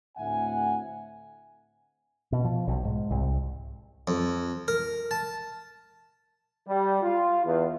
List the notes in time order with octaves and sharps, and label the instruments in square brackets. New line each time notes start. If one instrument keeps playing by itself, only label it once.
[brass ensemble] D2 A2 C4 E5 F#5 G#5
[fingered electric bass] B2
F3
B1
G#2
C2
[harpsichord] F2
A#4
A5
[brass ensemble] G3
F4
E2